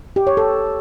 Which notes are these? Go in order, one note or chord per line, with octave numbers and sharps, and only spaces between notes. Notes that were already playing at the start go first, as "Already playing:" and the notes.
G4
C#5
A4